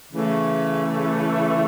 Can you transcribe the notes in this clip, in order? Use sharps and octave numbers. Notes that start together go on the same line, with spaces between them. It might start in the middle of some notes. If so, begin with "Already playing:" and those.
C#3 E3 A3